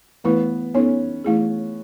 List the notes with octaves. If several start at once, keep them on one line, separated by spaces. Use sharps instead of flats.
E3 A3 B3 E4 B4
B3 C#4 D#4 A4 C#5
E3 A3 E4 G#4